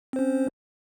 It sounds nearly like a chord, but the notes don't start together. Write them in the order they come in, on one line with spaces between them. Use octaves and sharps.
C4 C5 C#4